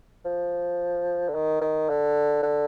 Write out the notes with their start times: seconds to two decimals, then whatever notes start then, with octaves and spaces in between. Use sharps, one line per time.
0.25 F3
1.28 D3
1.34 D#3
1.61 D#3
1.89 D3
2.43 D3